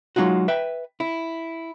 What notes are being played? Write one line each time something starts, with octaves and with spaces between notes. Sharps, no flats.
F#3 G#3 D#4 F4 F#4
B4 E5 G5
E4